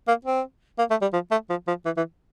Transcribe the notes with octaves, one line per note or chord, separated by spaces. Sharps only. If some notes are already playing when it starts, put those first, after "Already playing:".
A#3
C4
A#3
A3
G3
F3
A3
F3
F3
E3
E3